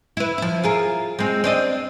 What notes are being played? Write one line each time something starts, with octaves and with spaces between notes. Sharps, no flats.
E4 B4
F3 E4
F4 G#4 A#4
G#3 C4
C4 D4 D#5